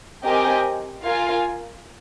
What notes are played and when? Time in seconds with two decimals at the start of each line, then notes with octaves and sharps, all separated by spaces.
0.22 C4 G4 A#4 D#5 G#5
1.03 F4 A#4 F5 G#5